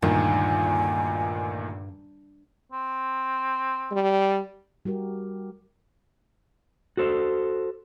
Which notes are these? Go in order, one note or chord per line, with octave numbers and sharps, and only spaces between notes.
D2 G2 A#2 D#3 G#5
C4
G3
G3 F#4 G4 A#4
F#4 A4 C5